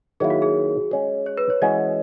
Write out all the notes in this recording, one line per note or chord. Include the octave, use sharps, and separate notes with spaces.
D#3 F#3 A#3 E4 G#4
F#4
G#4
G#3 C#4 G#4
C#5
B4
C#5
E3 G#3 C#4 F#4 D#5